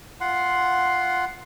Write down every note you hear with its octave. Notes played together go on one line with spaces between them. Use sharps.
F4 F#5 C6